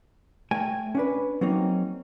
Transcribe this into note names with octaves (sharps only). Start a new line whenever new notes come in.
A3 G5 G#5
C#4 D4 B4
F#3 A#3 C4 C#4 D#4